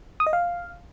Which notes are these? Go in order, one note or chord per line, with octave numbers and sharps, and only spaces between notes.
D#6
D#5
F5